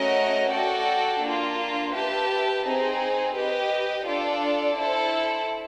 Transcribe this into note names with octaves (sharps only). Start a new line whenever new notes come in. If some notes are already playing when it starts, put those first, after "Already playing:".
Already playing: A3 C#4 F#4 A#4 D#5
F#4 A4 D5 G5
A#3 D4 F4
G4 B4 E5 A5
C4 D#4 G#4
G4 B4 D#5
D4 F4 A4 D5
E4 A4 C5